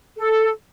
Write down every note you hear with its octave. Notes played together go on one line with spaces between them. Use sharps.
A4